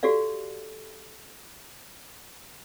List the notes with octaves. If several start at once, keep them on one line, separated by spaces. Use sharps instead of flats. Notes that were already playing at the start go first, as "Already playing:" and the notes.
F#4 G4 A4 D5 F5